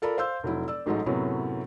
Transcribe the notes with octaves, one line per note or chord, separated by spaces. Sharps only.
F4 A4 A#4 D5 B5
C5 F5 C6 E6 G6
F1 F#3 E4
D5 E6
A1 G#2 F#3 G#3 A4 D#5
F#2 A2 C3 F#3 B3 C#4